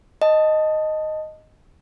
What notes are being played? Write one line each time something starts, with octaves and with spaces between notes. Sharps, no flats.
D#5 A5